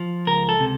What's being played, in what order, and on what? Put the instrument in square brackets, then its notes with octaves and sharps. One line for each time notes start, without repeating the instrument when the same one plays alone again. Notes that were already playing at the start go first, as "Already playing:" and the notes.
Already playing: [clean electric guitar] F3
C#2 A#4
A4
C3